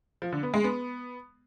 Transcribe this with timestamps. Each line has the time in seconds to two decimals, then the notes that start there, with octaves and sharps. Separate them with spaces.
0.22 F3
0.32 D3
0.43 B3
0.54 G#3
0.64 B3